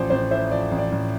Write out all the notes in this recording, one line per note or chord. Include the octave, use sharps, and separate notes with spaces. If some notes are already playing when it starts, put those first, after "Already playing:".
Already playing: A1 F3 C5 D5
A1 C5
A2 C5 E5
F3 D5
A1
D5
A1